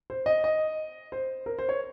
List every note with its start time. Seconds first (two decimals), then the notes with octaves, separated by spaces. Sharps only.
0.10 C5
0.26 D#5
0.44 D#5
1.12 C5
1.46 A#4
1.59 C5
1.69 C#5